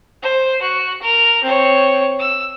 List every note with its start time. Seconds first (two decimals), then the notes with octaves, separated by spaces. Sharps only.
0.23 C5
0.61 F#4
1.02 A#4
1.43 C4 C#5
2.19 E6